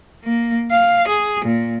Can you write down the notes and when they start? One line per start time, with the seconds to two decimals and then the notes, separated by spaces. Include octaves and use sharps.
0.24 A#3
0.71 F5
1.08 G#4
1.45 A#2